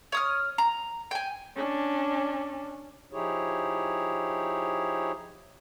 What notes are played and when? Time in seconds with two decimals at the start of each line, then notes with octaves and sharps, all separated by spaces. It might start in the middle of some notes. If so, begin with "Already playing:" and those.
0.12 C#5 D#6 F6
0.58 A#5
1.11 G5 G#5
1.56 C#4 D4
3.12 F3 D#4 E4 G4 G#4 C#5